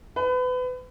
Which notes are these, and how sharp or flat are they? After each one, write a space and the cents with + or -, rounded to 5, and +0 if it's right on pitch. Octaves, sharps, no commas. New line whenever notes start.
B4 +30